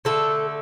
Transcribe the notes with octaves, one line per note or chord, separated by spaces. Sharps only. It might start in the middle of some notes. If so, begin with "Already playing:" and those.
D3 A3 A4